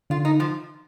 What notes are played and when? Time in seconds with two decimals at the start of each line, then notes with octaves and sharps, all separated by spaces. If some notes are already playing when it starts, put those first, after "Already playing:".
0.10 D3 F4
0.25 D#4
0.40 F3